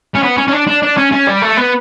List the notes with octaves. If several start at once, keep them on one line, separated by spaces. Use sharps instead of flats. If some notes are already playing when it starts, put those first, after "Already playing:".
C#4
B3
C#4
C#4
D4
D4
D4
C#4
C#4
G3
A3
B3